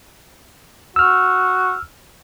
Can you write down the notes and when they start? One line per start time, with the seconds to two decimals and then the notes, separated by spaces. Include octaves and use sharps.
0.96 F#4 E6 F6